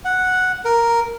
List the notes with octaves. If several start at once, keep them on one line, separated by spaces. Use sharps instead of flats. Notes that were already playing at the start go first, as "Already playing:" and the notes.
F#5
A#4